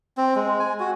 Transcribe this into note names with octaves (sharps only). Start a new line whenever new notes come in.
C4
G#3
G#5
F#4